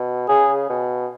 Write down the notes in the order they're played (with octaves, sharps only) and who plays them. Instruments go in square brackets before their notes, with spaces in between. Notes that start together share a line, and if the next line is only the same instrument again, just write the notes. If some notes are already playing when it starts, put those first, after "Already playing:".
Already playing: [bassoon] B2
[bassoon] C#3 [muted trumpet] G#4
[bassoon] B2